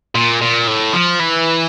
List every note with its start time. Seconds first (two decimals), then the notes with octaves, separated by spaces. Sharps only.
0.15 A#2
0.42 A#2
0.68 A2
0.93 F3
1.20 E3